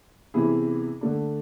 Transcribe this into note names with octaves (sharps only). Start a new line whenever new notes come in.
C3 E3 B3 E4 G#4
D3 A3 D4